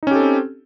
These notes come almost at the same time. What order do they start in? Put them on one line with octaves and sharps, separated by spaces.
D#4 C#4 G4 A4 C4